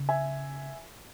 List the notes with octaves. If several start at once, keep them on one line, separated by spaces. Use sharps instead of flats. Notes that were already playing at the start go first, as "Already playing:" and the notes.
Already playing: C#3
E5 G#5